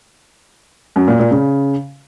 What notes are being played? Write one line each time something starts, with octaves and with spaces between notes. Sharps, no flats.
F#2
A#2
A#2
C#3